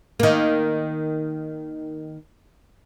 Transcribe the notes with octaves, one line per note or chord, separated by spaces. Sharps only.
D#3 A#3